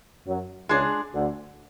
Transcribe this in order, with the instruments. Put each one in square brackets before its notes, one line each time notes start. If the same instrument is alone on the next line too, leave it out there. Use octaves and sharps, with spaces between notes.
[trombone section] F#2 F#3
[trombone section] C#2 C#3 [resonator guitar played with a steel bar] G#3 D4 G#4
[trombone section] D2 D3